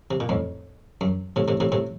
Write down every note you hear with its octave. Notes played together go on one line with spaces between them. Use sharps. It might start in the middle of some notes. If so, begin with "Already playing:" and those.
C3
A#2
F2 A2
F#2
A2 C3
A2 C3
A2 C3
A2 C3